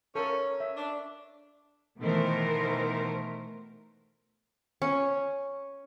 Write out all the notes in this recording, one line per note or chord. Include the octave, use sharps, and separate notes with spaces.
C#4 A4 A#4
E5
D4
B2 D#3 E3 A3 A#4 C5
C#4